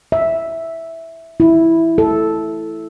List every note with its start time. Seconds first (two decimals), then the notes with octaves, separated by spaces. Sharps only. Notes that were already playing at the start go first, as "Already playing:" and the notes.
0.12 E5
1.40 E4
1.98 A4